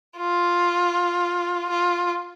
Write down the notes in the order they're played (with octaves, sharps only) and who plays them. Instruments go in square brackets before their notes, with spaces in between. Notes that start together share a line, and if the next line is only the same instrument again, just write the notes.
[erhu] F4
F4